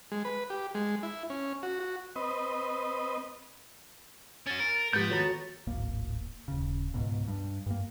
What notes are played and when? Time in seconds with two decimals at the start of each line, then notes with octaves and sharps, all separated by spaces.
0.12 G#3
0.25 B4
0.50 G4
0.75 G#3
1.03 E4
1.30 C#4
1.63 F#4
1.80 F#4
2.16 C4 B4 D#5
4.47 C#4 F#4 A6
4.60 A#4
4.93 G#2 F3 B3 G4 G6 A6
5.10 D#2 F#4 A4 C#5 A#5
5.67 D1 G#1 A#3
6.48 D#1 C#3
6.94 C#2 G#2 B2
7.28 G2
7.66 G2 A#3